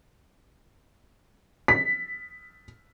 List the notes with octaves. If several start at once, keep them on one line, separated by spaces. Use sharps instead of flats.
B6